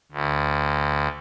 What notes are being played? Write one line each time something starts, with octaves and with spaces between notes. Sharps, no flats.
D2